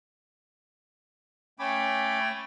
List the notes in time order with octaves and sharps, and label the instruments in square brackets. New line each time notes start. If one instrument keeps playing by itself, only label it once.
[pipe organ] A3 G5 G#6 [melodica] C#4 B5 D6